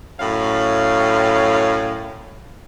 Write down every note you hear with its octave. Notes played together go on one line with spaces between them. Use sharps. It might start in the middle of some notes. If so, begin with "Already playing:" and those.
F#2 A2 C#5 F5